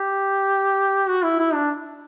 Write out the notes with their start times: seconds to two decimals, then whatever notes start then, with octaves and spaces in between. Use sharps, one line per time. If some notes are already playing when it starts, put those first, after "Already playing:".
Already playing: G4
1.09 F#4
1.23 E4
1.39 E4
1.54 D4